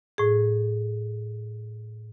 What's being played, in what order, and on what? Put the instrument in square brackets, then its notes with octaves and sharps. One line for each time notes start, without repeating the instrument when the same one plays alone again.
[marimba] A2 G#4